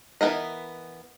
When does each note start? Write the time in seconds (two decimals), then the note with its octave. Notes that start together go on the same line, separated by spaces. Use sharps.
0.21 E3 A#3 B3 A#4 D#5